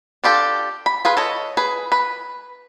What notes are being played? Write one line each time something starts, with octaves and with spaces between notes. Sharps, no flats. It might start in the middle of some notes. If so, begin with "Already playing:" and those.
D4 F4 G4 A4
B5
F4 G#4 B4
A4 C#5 D#5
G#4 B4
B4